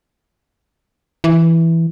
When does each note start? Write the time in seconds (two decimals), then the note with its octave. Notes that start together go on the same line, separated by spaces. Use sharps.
1.24 E3